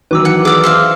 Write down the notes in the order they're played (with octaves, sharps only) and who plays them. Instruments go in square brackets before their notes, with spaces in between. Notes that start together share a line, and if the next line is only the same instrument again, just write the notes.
[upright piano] D#3 E3 F#3 [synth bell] B4 D6 E6
[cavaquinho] F#5
[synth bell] G#4 E6 F6 [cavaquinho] D5 D6
[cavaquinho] C5 E5 F5